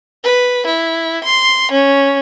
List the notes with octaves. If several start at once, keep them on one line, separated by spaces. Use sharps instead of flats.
B4
E4
C6
C#4